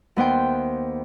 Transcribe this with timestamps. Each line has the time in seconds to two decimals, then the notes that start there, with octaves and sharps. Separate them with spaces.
0.16 D#2 B3 C5 G5